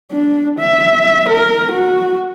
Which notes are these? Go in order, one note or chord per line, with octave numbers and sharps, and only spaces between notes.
D4
E5
A#4
F#4